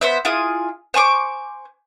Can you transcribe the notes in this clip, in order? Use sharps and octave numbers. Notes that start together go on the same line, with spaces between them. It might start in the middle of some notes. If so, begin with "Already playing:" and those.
B3 C5 E5
E4 F4 G#4 D#6
C5 G#5 C#6 D6